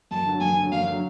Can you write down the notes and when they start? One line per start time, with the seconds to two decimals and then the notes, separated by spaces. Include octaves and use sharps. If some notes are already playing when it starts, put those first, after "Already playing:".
0.11 F#2 A5
0.26 D3 F#3
0.41 F#2 G#5
0.57 D3 F#3
0.72 F#2 F5
0.87 D3 F#3